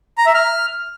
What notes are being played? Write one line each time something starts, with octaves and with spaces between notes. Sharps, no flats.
A#5
E5
F6